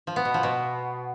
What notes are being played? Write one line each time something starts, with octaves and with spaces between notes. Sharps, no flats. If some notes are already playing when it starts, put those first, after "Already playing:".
F3
B3
B2
F3
B2